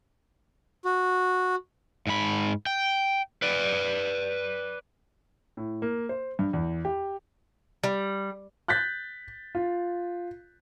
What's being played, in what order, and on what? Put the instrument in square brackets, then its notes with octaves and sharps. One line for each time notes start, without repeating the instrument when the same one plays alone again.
[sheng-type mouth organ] F#4
[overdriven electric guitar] G#2 B5
G5
B4 D5
[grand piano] A2
A#3
C5
G2
E2
G4
[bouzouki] G3
[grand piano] F#6 G6 A6 B6
F4